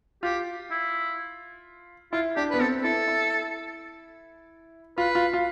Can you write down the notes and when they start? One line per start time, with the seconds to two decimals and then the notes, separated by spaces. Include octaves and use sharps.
0.23 F4 G4
0.71 E4
2.12 E4 F4
2.36 D4 G4
2.50 B3 B4
2.60 C4 A4
2.83 E4 A4
3.08 E4
4.97 F4 B4
5.15 F4
5.34 F4